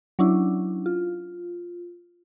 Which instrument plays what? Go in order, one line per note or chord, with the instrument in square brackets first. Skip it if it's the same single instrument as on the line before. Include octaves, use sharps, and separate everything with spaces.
[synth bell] F#3 C#4 D4 E4
F4